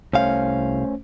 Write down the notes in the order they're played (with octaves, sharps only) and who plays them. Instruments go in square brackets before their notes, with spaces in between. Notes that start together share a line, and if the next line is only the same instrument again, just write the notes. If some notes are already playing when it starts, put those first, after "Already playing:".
[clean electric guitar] C2 F5 [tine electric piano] A3 C#4 C5